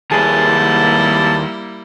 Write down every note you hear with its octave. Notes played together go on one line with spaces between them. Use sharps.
D#2 G3 A#3 E4 G#4 A5